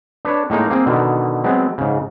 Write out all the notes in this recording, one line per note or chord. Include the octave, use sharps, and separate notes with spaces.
D4 B4 C#5 A5
A2 G#3 A#3 D#4 A#5
A#3 C4 G#4
B2 D3 D#3
F#3 G#3 B3 C4
G#2 C#3